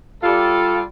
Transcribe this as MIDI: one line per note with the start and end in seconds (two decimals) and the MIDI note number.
0.23 0.81 55
0.23 0.81 65
0.23 0.81 69